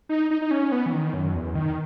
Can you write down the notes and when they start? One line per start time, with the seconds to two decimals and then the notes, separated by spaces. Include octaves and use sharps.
0.09 D#4
0.31 D#4
0.42 D#4
0.51 C#4
0.72 B3
0.86 E3
0.93 D#3
1.14 F#2
1.35 E2
1.55 D#3